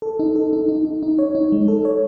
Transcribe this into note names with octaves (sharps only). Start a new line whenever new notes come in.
A4
D#4
A4
D#4
D#4
D#4
D#4
C#5
D#4
G#3
A4
C#5